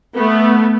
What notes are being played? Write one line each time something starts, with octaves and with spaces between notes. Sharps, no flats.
A3 B3